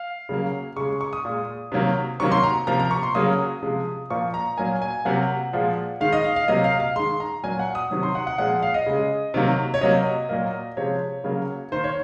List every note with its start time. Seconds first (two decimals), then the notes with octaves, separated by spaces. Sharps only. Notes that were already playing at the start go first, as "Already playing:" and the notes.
Already playing: F5
0.29 C#3 F#3 A#3
0.76 C#3 G#3 C#6
1.01 C#6
1.13 D#6
1.25 A#2 G#3
1.72 C3 D#3 F#3 A#3
2.20 C3 D#3 F#3 A#3 C#6
2.32 C6
2.44 A#5
2.67 C3 F3 A#3 A#5
2.79 A#5
2.91 C#6
3.03 C6
3.15 C#3 F#3 A#3 D#6
3.62 C3 F3 G#3
4.10 A#2 F3 A#3 C#6
4.34 A#5
4.57 A#2 F#3 A#3 G#5
4.82 G#5
5.05 C3 F#3 A#3 F#5
5.53 A#2 F3 G#3
6.00 D#3 G#3 F5
6.13 D#5
6.24 F5
6.36 F5
6.48 C3 F#3 A#3 D#5
6.64 F5
6.80 F5
6.96 D#3 G#3 C6
7.20 A#5
7.43 A#2 F#3 A#3 G#5
7.59 F#5
7.75 D#6
7.91 C3 D#3 F#3
8.03 C6
8.15 F#5
8.27 F#5
8.38 A#2 F3 G#3 F#5
8.63 F5
8.74 D#5
8.86 C#3 G#3
9.34 C3 D#3 F#3 A#3
9.74 C#5
9.81 C3 F#3 A#3 D#5
10.29 A#2 F#3 A#3
10.77 C3 F3 G#3 C#5
11.24 C#3 F#3 A#3
11.72 D#3 A#3 C5
11.84 C#5